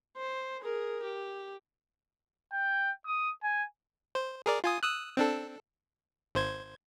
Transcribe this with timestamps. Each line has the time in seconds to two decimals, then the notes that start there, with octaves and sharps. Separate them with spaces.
0.17 C5
0.61 G#4 A#4
1.03 G4
2.53 G5
3.06 D#6
3.43 G#5
4.15 C5
4.46 G#4 A#4 D5
4.64 F4 G#5 D#6
4.83 D#6 E6 F#6
5.17 C4 D4 A4
6.35 G#1 C5 G#6